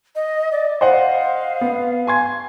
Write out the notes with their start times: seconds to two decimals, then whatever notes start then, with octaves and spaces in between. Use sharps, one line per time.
0.15 D#5
0.52 D5
0.81 C5 D#5 F5 F#5
1.61 B3
2.07 G#5 C6 G#6